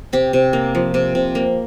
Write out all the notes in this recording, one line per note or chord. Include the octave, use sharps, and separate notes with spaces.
C3 G4
C3
A#3
F3
C3
C3
A#3